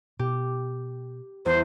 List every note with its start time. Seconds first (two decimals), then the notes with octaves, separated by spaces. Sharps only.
0.19 B2 G4
1.46 E2 C5